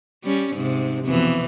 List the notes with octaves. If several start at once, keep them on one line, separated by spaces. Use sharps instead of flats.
G3 C#4
G#2 C3
F2 B2 E3